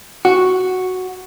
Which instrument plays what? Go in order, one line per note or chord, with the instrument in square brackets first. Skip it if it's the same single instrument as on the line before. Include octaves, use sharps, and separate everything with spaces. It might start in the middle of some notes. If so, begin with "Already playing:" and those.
[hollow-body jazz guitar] F#4